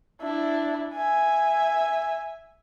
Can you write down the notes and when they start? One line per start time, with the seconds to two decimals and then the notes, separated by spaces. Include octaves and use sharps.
0.21 D4 E4
0.94 E5 G#5